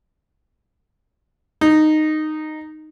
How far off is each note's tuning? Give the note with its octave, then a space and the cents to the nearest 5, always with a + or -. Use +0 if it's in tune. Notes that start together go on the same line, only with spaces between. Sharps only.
D#4 -10